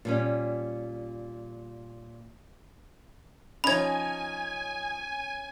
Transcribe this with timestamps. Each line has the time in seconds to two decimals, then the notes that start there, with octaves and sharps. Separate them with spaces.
0.05 A#2 G3 C#4
3.64 F3 C#4 D#4 C#5 G#5 B5 G#6